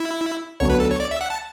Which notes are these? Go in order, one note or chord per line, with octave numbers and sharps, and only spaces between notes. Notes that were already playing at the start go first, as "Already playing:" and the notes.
Already playing: E4
D2 D3 F#3 B3 D4 C#5
B4
A4
C#5
D5
E5
F#5
A5